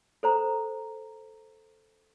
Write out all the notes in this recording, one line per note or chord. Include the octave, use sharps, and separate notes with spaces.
A4 C5 A#5